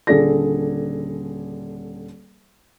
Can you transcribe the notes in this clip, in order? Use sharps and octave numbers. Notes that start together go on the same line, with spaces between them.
D#1 D3 G#4 A4 D5 A#6